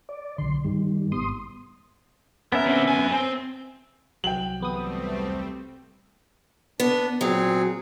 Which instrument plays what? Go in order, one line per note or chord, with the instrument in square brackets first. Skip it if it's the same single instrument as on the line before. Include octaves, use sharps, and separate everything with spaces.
[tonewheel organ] D5
[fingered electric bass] B1 D3 [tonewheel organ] C6
[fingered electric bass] G2 [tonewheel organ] D#3 G3
[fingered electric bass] G#1 B3 [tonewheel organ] C6 D#6
[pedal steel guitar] B3 C#4 E5 [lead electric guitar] A#4
[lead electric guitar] D3 C4
F#2 G#5
C4
[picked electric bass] C2 F#3 [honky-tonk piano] G5 F#7
[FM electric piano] E2 B3 D#6 [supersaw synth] G3 A3 C4
[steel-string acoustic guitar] B3 [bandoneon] D4
[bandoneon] A#2 C4 G#4 [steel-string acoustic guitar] F#3